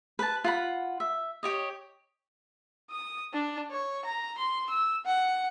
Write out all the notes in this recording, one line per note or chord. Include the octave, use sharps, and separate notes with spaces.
B4 A5
F4 F#5 B5
E5
G4 C#5 D#5
D#6
D4
C#5
A#5
C6
E6
F#5